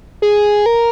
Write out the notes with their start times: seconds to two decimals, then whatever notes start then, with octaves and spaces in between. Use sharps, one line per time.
0.22 G#4
0.66 A#4